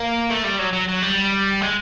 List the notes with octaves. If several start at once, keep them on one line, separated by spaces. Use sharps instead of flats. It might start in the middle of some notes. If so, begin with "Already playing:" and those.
Already playing: A#3
A3
G3
F#3
F#3
F#3
G3
G#3